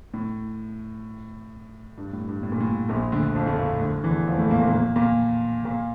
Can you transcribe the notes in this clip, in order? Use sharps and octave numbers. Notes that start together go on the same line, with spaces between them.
A2
G2
A2
G2
A2
A#2
A2
A#1 A#2
D2 D3
F2 F3
A2 A3
A#2 A#3
D2 D3
E2 E3
F2 F3
A2 A3
A#2 A#3
A#2 A#3
A#2 A#3
A#2 A#3
A#2 A#3